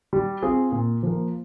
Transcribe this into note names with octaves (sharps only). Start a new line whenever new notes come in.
G3
C4 F4 G#4
A#2
F3 A#3